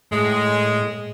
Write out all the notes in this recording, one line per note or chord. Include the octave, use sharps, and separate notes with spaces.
A2 G#3